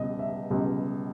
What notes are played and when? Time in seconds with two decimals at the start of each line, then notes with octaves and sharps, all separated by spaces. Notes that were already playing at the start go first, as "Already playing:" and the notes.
Already playing: C#2 B2 G3 D#5
0.19 E5
0.50 C#2 B2 G3